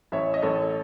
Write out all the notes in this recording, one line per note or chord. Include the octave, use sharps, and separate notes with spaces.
A1 C#5 E5
D#5
A1 A4 C#5